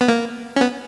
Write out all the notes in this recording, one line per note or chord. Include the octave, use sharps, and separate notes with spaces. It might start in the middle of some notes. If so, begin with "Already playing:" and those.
B3
A#3
C#4
B3